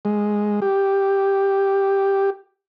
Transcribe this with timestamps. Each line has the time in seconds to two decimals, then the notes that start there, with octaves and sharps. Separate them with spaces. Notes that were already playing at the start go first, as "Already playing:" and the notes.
0.05 G#3
0.62 G4